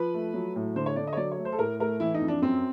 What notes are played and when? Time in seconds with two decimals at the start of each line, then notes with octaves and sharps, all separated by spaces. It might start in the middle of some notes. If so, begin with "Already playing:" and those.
Already playing: F3 B4
0.14 A3
0.34 F#3
0.56 A2
0.76 D3 C5
0.86 C#5
0.96 D3 D5
1.07 D#5
1.13 C#5
1.17 F#3 D5
1.31 C#5
1.38 A3
1.45 C5
1.52 A4
1.59 A2 A#4
1.80 A3 A#4
2.00 E3 E4
2.14 D#4
2.21 F2
2.28 D4
2.42 F#2 C4